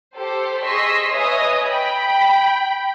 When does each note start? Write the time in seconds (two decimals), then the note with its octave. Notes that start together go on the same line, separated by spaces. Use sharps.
0.16 G4 A4 C5
0.63 G#4 D#5 C6 C#6 E6 B6
1.12 B4 C#5 D#5 E5 G#5 D#6
1.67 G5 B5